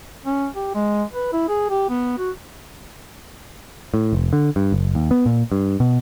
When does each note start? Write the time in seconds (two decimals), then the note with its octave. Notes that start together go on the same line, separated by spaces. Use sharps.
0.25 C#4
0.55 G4
0.75 G#3
1.12 B4
1.33 E4
1.49 G#4
1.70 G4
1.90 B3
2.18 F#4
3.94 A2
4.13 F1
4.33 D3
4.56 G2
4.72 F#1
4.95 D#2
5.11 B3
5.26 A#2
5.52 G2
5.80 B2